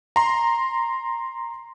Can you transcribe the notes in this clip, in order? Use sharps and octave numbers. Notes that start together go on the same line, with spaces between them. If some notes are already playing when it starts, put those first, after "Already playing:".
A#5 C6